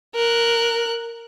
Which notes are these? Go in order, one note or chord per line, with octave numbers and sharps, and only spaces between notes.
A#4 F#6